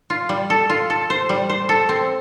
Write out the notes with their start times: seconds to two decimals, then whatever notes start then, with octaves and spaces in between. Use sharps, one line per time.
0.10 F4
0.29 G3
0.50 A4
0.70 F4
0.90 A4
1.10 C5
1.29 G3
1.49 C5
1.69 A4
1.89 C4